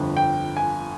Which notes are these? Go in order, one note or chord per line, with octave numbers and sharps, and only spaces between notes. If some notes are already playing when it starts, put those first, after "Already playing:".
Already playing: G1 F2 D3
G5
G#5